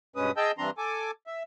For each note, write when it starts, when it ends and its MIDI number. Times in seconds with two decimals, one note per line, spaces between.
0.16 0.31 43
0.16 0.31 47
0.16 0.31 56
0.16 0.31 61
0.16 0.31 71
0.16 0.31 87
0.37 0.52 68
0.37 0.52 75
0.37 0.52 79
0.37 0.52 81
0.37 0.52 88
0.37 0.52 91
0.58 0.70 43
0.58 0.70 52
0.58 0.70 60
0.58 0.70 62
0.58 0.70 82
0.58 0.70 84
0.78 1.11 69
0.78 1.11 80
0.78 1.11 86
1.27 1.43 76